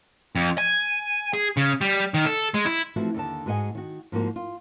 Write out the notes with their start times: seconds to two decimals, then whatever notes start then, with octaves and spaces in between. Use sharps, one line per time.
0.36 F2
0.58 G#5
1.34 G#4
1.57 C#3
1.81 G3
2.14 D#3
2.26 A4
2.54 G#3
2.66 E4
2.96 E3 F3 A3 C4 F#4
3.14 D#2 D3 A5
3.46 G#2 F#4 G#4 D#5 F#5 G#5
3.75 D#3 F#4
4.12 G#2 F3 A#3 F#4
4.36 F4